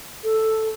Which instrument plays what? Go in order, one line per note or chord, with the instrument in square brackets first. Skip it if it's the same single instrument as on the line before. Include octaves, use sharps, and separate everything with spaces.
[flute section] A4